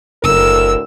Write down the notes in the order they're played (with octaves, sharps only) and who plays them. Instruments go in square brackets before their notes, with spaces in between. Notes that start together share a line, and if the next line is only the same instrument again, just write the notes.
[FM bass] F#1 [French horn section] D2 A2 A#4 [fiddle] E6